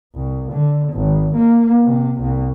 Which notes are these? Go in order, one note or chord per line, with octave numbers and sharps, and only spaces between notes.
C2
D3
G#1
A#3
C3
C2